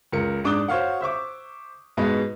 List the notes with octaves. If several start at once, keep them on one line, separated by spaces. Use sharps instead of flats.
C#2 A#4 C#7
G#2 D4 D6 D#6 F#6 G7
F#4 C5 C#5 F5 F#5
C5 E5 C#6 D6
G#2 B2 G#3 B3 D#5 B5